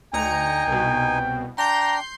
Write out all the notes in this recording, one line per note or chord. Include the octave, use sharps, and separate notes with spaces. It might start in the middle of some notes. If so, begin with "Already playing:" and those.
D2 D#4 G5 G#5 A#5 C#7
C2 B2
D4 G5 A#5 C6 G6